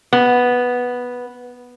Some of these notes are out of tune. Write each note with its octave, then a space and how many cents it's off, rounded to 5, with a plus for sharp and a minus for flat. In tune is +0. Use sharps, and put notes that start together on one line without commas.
B3 -5